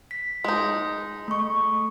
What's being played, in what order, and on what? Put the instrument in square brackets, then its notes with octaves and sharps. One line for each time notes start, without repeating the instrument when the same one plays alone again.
[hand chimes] B6
[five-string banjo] G#3 D#4
[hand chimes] A3 C#6